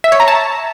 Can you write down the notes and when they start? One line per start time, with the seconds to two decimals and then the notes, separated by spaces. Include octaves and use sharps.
0.04 E5
0.12 C#5
0.20 A#5
0.28 A5